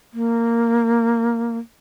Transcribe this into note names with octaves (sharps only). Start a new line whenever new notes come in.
A#3